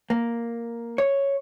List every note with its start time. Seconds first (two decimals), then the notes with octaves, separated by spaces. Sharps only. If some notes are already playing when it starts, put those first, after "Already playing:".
0.10 A#3
0.98 C#5